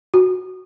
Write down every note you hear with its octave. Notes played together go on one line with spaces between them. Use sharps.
F#4